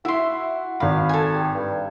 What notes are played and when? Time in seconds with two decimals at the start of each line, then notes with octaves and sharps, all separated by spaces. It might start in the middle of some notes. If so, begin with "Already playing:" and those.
0.05 E4 F#4 E5 C6
0.80 G#1 F5 B5
1.09 A4 G#5
1.35 G4
1.54 G2